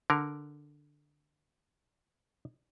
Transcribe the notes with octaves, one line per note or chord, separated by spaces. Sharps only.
D3 A#4